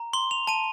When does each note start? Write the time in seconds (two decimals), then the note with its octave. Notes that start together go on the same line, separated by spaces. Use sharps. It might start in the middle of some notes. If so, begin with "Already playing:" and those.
Already playing: A#5
0.13 C6 G7
0.31 F7
0.47 A5 D#7